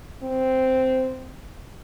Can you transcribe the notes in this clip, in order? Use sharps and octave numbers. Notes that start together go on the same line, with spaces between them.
C4